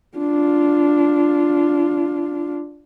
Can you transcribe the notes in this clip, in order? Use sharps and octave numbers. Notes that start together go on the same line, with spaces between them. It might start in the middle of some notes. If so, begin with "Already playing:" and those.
D4 F4